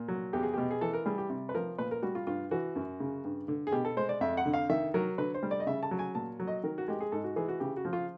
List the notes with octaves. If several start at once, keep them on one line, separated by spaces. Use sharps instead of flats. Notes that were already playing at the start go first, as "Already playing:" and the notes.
Already playing: A#2
F#3
E2 G4
G#4
B2 G4
G#4
E3 A4
A#4
G3 G#4
G4
C3
B4
F3 A#4
A#2 B4
A#4
G3 F#4
F4
G2 F4
E3 F#4
F#2
C#3
G2
D3
G#4
B2 G4
A4
G#3 C5
D5
F2 E5
F#5
D3
F5
D#3 E5
F#3 A#4
D3 B4
C5
G3
D5
D#5
C#3 E5
A5
F#3
G#5
A#2 A5
F#3
D#5
D#3 A#4
F#4
G#3 G4
G#4
G#2 A4
F#4
E3 G#4
F#4
C#3 G4
F#4
F3
F4